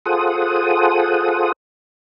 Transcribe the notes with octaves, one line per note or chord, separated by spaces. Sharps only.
F4 G#4 A4 C5 F#5 D#6